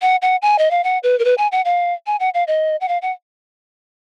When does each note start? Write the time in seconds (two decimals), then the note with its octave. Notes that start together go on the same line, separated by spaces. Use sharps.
0.02 F#5
0.22 F#5
0.42 G#5
0.59 D#5
0.71 F5
0.84 F#5
1.03 B4
1.19 A#4
1.25 B4
1.38 G#5
1.52 F#5
1.65 F5
2.07 G#5
2.20 F#5
2.34 F5
2.47 D#5
2.81 F#5
2.88 F5
3.02 F#5